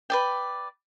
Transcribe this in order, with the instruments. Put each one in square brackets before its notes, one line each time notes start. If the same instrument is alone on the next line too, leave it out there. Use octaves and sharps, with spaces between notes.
[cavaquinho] B4 D5 G5